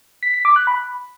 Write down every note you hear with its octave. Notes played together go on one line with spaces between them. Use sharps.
B6
B6
D6
F#6
B5